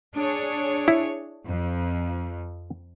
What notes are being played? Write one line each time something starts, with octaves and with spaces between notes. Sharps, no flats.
D4 G#4 C#5
E4
F2